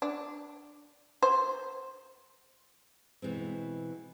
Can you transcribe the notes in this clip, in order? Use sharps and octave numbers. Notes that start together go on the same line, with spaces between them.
D4
C5
B2 E3 G#3 C4